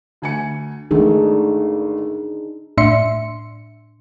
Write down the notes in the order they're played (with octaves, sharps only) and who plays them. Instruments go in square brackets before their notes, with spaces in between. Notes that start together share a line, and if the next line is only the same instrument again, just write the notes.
[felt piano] D2 G#5 C#7
[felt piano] G#1 A3 [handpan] D4 D#4 G#4
[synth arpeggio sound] A2 D4 E5 C6 C#7